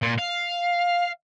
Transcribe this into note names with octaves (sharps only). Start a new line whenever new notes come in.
A#2
F5